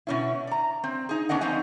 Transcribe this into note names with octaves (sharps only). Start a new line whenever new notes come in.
B2 C#4 E4
D5 A#5
C4
D#4 G#4
B3 C#4 D4 D#5 F#5
F3 C4 C#4 D#4 D#5